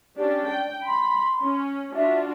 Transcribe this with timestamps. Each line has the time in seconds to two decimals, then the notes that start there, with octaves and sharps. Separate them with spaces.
0.18 C#4 D4 G4 D5
0.48 G5
0.86 B5 C6
1.41 C#4
1.95 D4 F4 F#4 E5